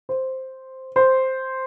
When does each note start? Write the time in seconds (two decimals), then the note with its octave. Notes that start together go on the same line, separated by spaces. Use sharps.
0.09 C5
0.96 C5